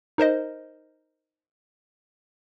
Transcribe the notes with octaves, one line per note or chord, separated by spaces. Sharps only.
D#4 A#4 C5 D#5